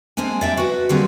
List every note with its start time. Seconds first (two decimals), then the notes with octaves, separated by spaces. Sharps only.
0.17 G#3 A#3 C4 D4 G#5
0.41 D5 E5 G5
0.57 F#4 B4
0.89 D3 F#3 G3 A#3 C4 G#4